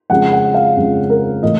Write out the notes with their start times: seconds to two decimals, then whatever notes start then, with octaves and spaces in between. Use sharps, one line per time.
0.10 F2 C#3 F3 G#3 C#4 F#5
0.33 F#5
0.54 F5
0.77 F2 C#3 F3 G#3 C#4
1.10 A#4
1.43 A2 E3 A3 D#5